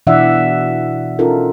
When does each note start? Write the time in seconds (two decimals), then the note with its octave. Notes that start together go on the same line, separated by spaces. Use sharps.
0.07 B2 E3 D4 D5 E5 F#5
1.19 C#4 D#4 F4 A4 A#4